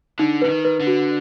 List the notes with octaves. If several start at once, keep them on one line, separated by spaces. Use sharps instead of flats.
D3 D#4
D3 B4
D#3
B4
D3
F#4